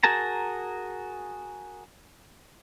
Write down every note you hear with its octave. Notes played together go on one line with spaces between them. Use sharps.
F#4 G#4 A#4 A5 A#5